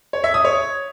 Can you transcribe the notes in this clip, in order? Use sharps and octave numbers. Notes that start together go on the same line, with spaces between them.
C#5
E5
D#6
C#5